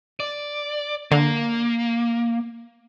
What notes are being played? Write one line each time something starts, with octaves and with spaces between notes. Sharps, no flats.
D5
D3 A#3